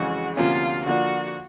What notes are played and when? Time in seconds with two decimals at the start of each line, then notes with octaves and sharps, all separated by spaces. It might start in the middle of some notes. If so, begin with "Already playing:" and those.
Already playing: F2 C#3 E3 G#3 F#4
0.36 D2 C3 F3 A#3 C#4 F4
0.86 D3 F3 A#3 D4 F#4